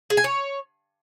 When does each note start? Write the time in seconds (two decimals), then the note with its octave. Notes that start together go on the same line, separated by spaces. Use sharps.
0.10 G#4
0.17 G#5
0.24 C#5